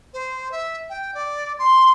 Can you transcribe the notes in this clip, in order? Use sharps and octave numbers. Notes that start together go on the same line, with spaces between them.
C5
E5
G5
D5
C6